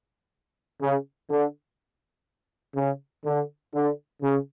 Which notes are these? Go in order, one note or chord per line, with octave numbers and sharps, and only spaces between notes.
C#3
D3
C#3
D3
D3
C#3